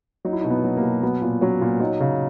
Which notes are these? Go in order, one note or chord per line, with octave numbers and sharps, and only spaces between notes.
F#3 D#4
E4
B2 D#4
B3
F#3
A#3
B2
F#3 B3
A#2
F#3 C#4
A#2
F#3 D#4
C#3